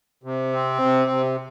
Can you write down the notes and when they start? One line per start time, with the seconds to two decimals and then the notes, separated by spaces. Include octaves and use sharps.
0.24 C3
0.53 C4
0.82 C3
1.11 C3